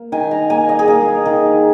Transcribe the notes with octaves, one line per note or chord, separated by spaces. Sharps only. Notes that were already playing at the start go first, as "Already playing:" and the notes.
Already playing: A#3
D#3 G#5
A#5
A#3 G#5
D#5
G#4
A#3 A#4
D#3